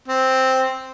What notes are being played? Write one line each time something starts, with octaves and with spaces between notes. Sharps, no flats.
C4